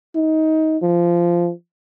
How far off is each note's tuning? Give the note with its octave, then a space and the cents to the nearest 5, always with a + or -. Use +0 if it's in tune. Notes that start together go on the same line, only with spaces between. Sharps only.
D#4 +20
F3 -15